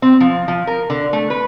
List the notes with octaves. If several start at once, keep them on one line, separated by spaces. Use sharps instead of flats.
C4
F3
F3
A#4
D3
A3
B4